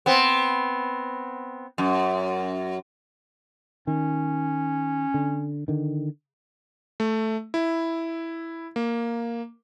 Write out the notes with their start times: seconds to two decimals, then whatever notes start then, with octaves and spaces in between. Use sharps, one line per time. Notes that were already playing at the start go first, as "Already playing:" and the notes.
0.06 B3 C4
1.78 F#2
3.87 D#3 C#4
5.14 D3
5.68 D3 D#3
7.00 A3
7.54 E4
8.76 A#3